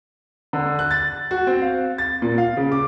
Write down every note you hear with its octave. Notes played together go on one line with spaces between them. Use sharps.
D3
F#6
A6
F#4
C4
F5
A6
A#2
F5
C#3
D6